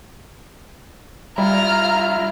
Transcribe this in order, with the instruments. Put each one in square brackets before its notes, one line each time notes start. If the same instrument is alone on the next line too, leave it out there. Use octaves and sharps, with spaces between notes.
[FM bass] G3 [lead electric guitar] E4 F4 [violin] A#5 F6